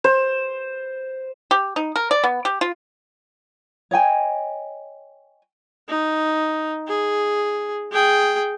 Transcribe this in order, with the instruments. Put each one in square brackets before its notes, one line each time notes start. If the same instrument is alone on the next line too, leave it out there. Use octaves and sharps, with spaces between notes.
[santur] C5
[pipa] G4
D#4
A#4
D5
B3
G4
F4
[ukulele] C#5 D#5 G5 G#5
[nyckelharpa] D#4
G#4
G#4 G5